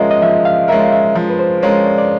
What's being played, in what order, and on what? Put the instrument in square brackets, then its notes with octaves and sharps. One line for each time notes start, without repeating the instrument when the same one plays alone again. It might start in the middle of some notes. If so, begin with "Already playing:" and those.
Already playing: [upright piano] F3 G#3 C#4 F4 A#4 [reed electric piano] D#5 E5
[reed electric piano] D#5
[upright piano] F3 [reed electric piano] E5
[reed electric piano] F5
[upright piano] G#3 C#4 F4 A#4 [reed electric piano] E5
[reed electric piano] E5
[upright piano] F3
[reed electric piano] B4
C5
[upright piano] G#3 C#4 F4 A#4 [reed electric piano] C#5
[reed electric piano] D5
D5